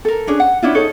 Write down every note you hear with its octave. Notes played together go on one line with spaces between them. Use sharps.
A4 A#4
C#4 D4 G#4
F#5
C#4 D4 E4 F4
D#4 G#4 A4 C#5